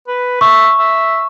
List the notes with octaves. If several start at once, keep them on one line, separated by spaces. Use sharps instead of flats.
B4
E5 C#6
E5